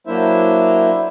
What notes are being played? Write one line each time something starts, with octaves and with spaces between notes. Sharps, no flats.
F#3 A#3 D4 E4 C5 E5